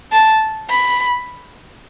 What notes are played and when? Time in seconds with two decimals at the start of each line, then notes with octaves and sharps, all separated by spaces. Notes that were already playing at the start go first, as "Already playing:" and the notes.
0.12 A5
0.70 B5